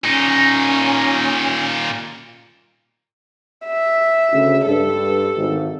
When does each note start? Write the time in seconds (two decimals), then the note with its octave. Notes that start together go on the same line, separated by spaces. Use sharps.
0.04 A#2 C#4 D#4
3.66 E5
4.32 D2 C#3
4.66 G2 A4
5.36 G#1